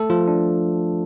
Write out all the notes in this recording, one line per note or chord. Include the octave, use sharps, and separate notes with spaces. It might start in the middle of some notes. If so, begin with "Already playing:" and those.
Already playing: A3 A4
F3 F4
D4